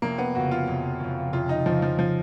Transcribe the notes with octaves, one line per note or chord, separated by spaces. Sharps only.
F1 A#3
B3
F2 C#3 F#4
F4
F1
F2 C#3
F1 F4
D#4
F2 C#3 F3
F3
F3